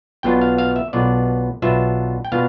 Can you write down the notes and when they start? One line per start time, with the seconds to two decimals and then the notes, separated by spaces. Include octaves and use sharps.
0.23 B1 B2 B3 D4 F4 G5
0.41 F5
0.58 F5
0.76 E5
0.93 B1 B2 B3 D4 F4 D5
1.62 B1 B2 B3 D4 F4 E5
2.25 G5
2.32 B2 B3 D4 F4 F5